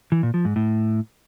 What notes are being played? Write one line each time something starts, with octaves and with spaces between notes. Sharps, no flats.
E3
A#2
F3
G#2
A2